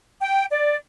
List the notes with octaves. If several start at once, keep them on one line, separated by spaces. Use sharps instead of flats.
G5
D5